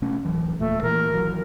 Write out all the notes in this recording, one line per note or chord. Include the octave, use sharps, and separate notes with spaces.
C3 A3 C#4
D1 E3 F#3
D#1 A#2 A3
A#2 E3 A#3 A#4
G#1 E3 F#3